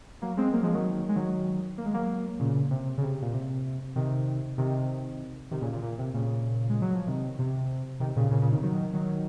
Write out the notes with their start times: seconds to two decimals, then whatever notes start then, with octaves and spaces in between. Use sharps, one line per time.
0.22 F#3 A#3
0.37 G#3 C4
0.53 F#3 A#3
0.63 F3 G#3
0.74 D#3 F#3
1.09 G#3
1.15 D#3 F#3
1.78 A#3
1.85 G#3
1.94 F#3 A#3
2.40 A#2 C#3
2.70 C3
2.98 C#3
3.02 C3
3.22 A#2
3.33 C3
3.96 C3 D#3
4.58 C3 D#3
5.51 C3 D#3
5.61 A#2 C#3
5.73 A#2
5.83 A#2
5.98 C3
6.14 A#2 C#3
6.70 G#3
6.82 F#3
6.94 F3
7.07 C3 D#3
7.39 C3
8.00 C3 D#3
8.16 A#2 C#3
8.31 A#2 C#3
8.42 A#2 C#3
8.52 C3 D#3
8.63 D#3 F#3
8.94 D#3 F#3